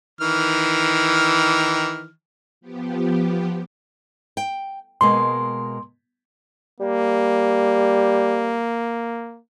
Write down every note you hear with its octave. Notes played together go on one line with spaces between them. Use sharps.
D#3 E3 F6
F3 B3 G4
G5
B2 G#3 A#3 C6
G3 A#3